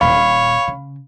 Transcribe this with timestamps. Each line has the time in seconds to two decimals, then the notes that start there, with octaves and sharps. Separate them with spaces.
0.01 D#1 A#2 C#5 F5 B5
0.68 C#3